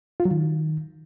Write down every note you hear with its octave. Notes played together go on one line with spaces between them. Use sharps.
F4
F#3
D#3